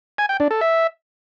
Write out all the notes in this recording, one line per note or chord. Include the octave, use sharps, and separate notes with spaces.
G#5
G5
D4
A4
E5